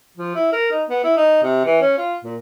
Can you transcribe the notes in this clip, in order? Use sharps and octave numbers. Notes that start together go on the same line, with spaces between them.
F3
E4
A#4
D#4
B3
E4
D#4
C3
E3
C#4
F4
A#2